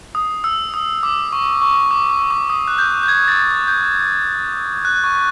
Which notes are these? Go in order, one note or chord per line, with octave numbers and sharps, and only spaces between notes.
D#6
E6
D#6
D6
C#6
C#6
D6
C#6
D6
D#6
F#6
G6
G6
G#6
A6
G6
F#6
C#6